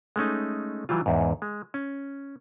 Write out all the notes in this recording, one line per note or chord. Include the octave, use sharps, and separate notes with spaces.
G#3 A3 C#4 D#4
E3 F#3 G3 F4
E2 G#2
G#3
C#4